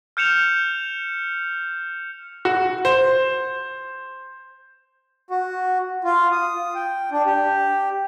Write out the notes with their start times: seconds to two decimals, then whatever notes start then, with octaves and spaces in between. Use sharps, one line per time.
0.17 F6 G6 C#7 E7 F7
2.45 F#4
2.85 C5
5.30 F#4
6.04 F4
6.32 D#6
6.75 G5
7.12 D4
7.26 G4